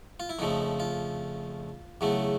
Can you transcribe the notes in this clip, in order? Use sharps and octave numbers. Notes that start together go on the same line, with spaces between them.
F4
E4
F2 C#3 F3 A3 D#4
F4
E2 C#3 F#3 A3